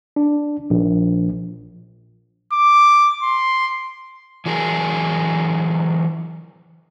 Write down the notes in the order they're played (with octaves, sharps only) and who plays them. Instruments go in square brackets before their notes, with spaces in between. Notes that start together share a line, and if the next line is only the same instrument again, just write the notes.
[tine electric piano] D4
A#1
[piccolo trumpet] D6
C6
[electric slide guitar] E3 F#3 G#4 A#4